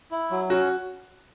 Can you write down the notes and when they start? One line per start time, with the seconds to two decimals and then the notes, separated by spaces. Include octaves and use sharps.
0.11 E4
0.31 F#3
0.50 C#4 F#4